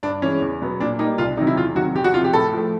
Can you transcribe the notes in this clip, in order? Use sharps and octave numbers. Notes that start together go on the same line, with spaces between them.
G2 D4
E3 G#3 C#4
E2
B2 F#3 B3
A#2 D4
G3 A#3 D#4
C2 F4
C3 D#3 F#3 D#4
E4
E2 F4
C3 D#3 F#3 F#4
E2 G4
F#4
C3 F3 F4
G4
A2 A4
F3 A3